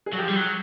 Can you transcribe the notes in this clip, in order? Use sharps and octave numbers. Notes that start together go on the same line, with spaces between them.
G#4
F#3
F3 G4
G3
F#3